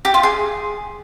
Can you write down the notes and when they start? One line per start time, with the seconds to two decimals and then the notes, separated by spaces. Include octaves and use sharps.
0.05 G4
0.14 F4
0.23 G#4